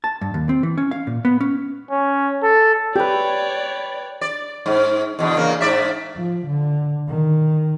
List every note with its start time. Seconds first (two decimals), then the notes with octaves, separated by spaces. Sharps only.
0.04 A5
0.21 G2
0.34 D#2
0.49 C4
0.63 E3
0.78 C#4
0.91 F5
1.07 A#2
1.25 B3
1.41 C#4
1.91 C#4
2.43 A4
2.96 G4 B4 C#5 D5 G5
4.21 D5
4.66 G#2
5.19 E2 B2 D3
5.37 E2 C#3 A#3
5.61 G#2 D5 E5
6.16 F3
6.47 D3
7.08 D#3